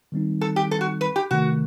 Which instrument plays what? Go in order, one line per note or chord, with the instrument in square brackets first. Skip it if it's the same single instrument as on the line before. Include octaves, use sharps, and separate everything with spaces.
[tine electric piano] D#3 G3 C4 D#4
[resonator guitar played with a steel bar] A4
G4
A4
F#4
B4
G4
[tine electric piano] C3 D#3 A3 [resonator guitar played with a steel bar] F#4